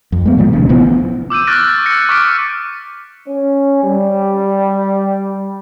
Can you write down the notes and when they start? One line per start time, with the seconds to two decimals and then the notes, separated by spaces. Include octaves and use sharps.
0.12 F2
0.26 G#3 B3
0.37 A2 D#3 F3
0.52 E1 D2 C3
0.69 A1 E3 F3 B3
1.30 D6 E6 G6 D#7
1.47 C#6 F6 F#6 A6 A#6 D7
1.86 A#6 C#7
2.09 C#6 D6 F6 B6 D7
3.28 C#4
3.83 G3